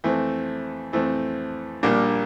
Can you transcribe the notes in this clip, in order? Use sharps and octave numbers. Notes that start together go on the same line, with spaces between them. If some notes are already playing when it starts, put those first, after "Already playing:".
F2 E3 A3 C4
F2 E3 A3 C4
A#1 A#2 G3 A#3 D4